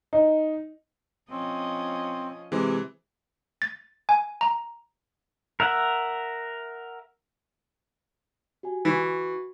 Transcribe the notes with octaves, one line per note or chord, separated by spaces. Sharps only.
D#4
F3 C4 C#4 D#5
C3 E3 G#3
A6
G#5
A#5
A#4 E5 F#5
F#4 G4 G#5
E3 F#4 C#6